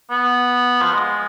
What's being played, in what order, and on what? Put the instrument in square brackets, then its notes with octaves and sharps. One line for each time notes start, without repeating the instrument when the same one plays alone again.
[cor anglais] B3
F3
G#3